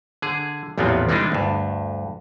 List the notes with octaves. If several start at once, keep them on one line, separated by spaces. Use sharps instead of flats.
D3 G#4
A1 E2 A#2 F3 B3 C4
E3 G3 G#3 B3 D4 D#4
D2 G2